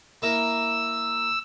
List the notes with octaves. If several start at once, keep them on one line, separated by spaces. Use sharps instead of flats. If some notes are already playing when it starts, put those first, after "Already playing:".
A#3 E4 A#4 E6